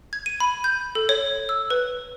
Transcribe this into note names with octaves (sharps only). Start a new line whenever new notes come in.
G#6
D#7
B5
G6
A4
C#5
E6
B4